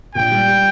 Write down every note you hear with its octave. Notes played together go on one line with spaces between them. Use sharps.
A#1 G5
G3
G3